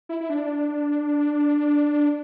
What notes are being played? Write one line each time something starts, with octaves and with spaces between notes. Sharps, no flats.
E4
E4
D4